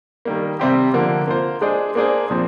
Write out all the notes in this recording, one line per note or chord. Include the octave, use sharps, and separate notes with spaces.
D#3 G3 A#3
C3 G3 C4 G4
D3 F3 A#3
A#3 F4 C5
G#3 D4 G#4 C5
A#3 D4 G#4 C5
A#2 F3 C4